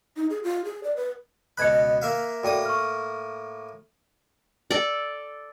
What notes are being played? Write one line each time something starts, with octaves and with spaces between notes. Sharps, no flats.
D#4
G#4
F4
G#4
D5
B4
C#2 B2 B5 F#6 G#6 C#7
A#3 E5 F5
A2 A#3 F#4 D5 G5 D#6
C#6 F6
A4 D5